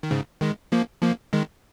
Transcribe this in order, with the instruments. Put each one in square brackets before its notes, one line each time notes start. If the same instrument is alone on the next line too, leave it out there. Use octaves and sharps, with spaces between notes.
[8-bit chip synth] D#3
G#2 C#3
D#3 G#3
F3 A#3
F3 A#3
D#3 G#3